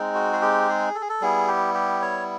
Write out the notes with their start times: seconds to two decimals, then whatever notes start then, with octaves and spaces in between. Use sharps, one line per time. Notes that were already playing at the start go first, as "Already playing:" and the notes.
Already playing: G#3 C4 D#4
0.15 F#4
0.33 G#4
0.42 G4
0.69 G#4
0.95 A4
1.01 G#4
1.09 A4
1.21 G3 B3 E4 G#4
1.47 G4
1.74 G4
2.02 C#5